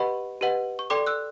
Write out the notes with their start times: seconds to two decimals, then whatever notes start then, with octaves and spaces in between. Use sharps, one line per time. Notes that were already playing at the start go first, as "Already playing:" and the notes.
Already playing: G4 B4 D#5 F#5 B5 C#6
0.41 G4 B4 D#5 F#5
0.79 C#6
0.90 A4 D5 G5 C6 D6
1.06 E6 F#6